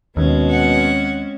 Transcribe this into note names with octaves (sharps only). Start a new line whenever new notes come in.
D#2 B2 G#3 C4 C#4
F#5